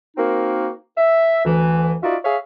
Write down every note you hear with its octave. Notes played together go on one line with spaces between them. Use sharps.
A#3 C4 D#4 F#4 A#4
E5
D2 E3
D#4 F4 F#4 D5 E5
G#4 C#5 E5 F5